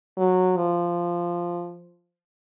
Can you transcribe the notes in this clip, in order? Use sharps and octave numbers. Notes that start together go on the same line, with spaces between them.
F#3
F3